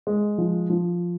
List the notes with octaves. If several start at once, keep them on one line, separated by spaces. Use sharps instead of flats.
G#3
F3
F3